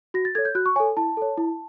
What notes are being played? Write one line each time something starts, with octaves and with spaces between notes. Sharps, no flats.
F#4 A#6
A6
A4 C#5 G#6
G6
F#4 F#6
C#6
A4 C#5 G#5
E4 A5
A4 C#5
E4